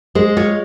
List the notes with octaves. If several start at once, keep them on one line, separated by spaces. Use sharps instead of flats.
G#3 C5
F4 C#5